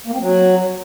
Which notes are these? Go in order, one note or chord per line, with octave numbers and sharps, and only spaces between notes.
A#3
C4
F#3